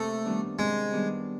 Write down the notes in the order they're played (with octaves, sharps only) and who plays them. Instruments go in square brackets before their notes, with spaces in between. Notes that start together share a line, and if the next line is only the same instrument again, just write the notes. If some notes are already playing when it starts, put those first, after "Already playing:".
Already playing: [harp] C3 A#3 [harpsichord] A3
[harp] D#3 G3 B3 D4
[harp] C3 [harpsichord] G#3
[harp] D#3 G3 B3 D4